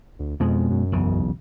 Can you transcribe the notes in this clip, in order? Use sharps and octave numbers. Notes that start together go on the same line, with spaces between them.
D2
F2 B2 G#3
F#2
E1 B1 C#3